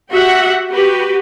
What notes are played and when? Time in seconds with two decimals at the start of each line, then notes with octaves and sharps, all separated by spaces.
0.10 F#4 G4 E5 F#5
0.71 F#4 G4 B4